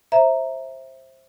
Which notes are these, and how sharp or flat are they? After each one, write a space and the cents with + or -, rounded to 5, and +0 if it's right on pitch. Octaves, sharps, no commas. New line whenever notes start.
C5 +20 E5 +0 A#5 +0